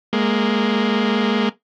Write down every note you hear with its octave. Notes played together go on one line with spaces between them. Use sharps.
G#3 A#3